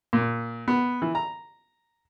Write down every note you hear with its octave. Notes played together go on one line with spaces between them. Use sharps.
A#2
B3
E3
A#5